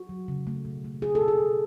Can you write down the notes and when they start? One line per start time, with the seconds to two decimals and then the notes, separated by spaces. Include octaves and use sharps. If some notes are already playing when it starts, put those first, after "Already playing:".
Already playing: F#4
0.09 F#3
0.28 C#3
0.47 A3
0.65 B2
0.84 A3
1.02 B2 G#4
1.15 A4
1.21 B2
1.28 G#4
1.40 B2